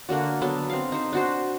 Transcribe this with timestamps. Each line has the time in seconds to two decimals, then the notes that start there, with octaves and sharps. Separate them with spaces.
0.09 D3 A#3 D4 F#4
0.42 F#3 B3 D4 A4
0.70 C4 F5
0.92 D#4 C5
1.13 D4 F#4 C5